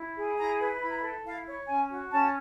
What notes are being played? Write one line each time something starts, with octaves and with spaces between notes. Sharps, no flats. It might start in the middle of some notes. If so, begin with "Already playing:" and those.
Already playing: E4
G#4
E4 A#5
B4
E4 B5
A#5
B5
A4
E4 F5
C#5
C#4 G#5
F#4
C#4 A5